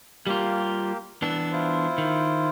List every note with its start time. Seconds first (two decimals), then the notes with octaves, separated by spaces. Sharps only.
0.27 G3 A#3 F4 G4
1.22 E3 B3 D4 E6
1.52 E4 F4 C5
1.98 D#3